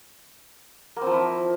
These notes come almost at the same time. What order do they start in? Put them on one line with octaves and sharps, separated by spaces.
A#3 C4 F3 E4